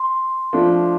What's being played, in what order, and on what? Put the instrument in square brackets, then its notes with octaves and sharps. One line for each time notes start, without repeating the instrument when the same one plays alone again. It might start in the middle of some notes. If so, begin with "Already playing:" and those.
Already playing: [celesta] C6
[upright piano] F3 A3 D4